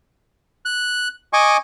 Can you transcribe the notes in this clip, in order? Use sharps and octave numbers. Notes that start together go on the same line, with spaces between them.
F#6
D#5 G#5 C#6 D6